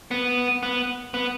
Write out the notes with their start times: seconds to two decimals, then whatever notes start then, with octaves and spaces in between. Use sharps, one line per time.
0.11 B3
0.63 B3
1.14 B3